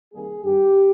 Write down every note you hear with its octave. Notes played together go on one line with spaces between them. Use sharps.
C2 C3 D#3 G3 A#3 G#4
G2 D#3 G3 G4